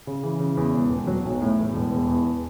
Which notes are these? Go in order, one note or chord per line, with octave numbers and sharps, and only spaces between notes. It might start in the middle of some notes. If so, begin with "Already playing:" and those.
C#3
E3
C#3
E2
E1
E1
F#3
B1
A2
E2
E1
E2
E2